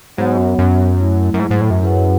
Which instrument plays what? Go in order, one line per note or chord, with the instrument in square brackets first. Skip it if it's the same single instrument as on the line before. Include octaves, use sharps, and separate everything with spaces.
[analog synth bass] G#2 [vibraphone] F#3 B3 F#4 C#5 F#5
[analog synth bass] F#2
F#2
[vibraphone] F#3 A3 E4
[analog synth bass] F#2
G#2
G#2
A2
F#2
[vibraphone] E4 G#4 B4 F#5